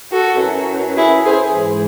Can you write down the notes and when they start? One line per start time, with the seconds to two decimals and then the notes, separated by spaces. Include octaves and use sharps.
0.12 F#4 A4
0.41 F#2 E3
0.97 E4 G#4
1.25 G#4 C5
1.53 G#2 E3